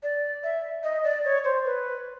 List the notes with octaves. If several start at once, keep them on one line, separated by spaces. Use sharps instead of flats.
D5
E5
D#5
D5
C#5
C5
B4